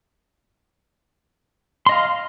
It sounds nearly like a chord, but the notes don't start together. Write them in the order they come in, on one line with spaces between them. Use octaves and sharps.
C6 D#5 F5